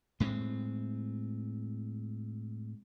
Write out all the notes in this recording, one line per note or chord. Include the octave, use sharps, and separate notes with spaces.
A2 G#3 A#3 C4